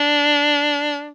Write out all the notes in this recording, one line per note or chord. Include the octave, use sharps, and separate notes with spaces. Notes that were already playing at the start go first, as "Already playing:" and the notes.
Already playing: D4